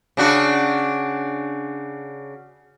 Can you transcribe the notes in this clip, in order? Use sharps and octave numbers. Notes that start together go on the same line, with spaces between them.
C#3 D4 F#4